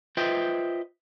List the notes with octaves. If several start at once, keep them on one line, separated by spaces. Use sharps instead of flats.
F4 B4 C5 D#5 E5 G5